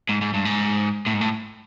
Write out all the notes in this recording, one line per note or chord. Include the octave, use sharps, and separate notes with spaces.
G#2
G#2
G2
G#2
A2
G#2
A2